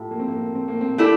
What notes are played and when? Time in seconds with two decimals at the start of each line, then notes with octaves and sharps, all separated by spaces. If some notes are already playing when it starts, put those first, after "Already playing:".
Already playing: A2 F4 G4
0.11 A#3
0.20 C4
0.28 A#3
0.55 C4
0.68 A#3
0.81 C4
0.98 A3 D4 E4 G4